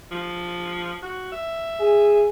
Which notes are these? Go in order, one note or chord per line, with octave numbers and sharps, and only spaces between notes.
F3
F#4
E5
G#4